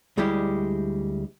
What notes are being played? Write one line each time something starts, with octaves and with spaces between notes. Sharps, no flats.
D2 G3 G#3 E4 G4